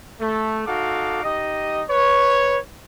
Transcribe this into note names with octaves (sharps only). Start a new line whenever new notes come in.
A3
D#4 F#4 A4 F5 D6
D#4 G4 D#5
B4 C#5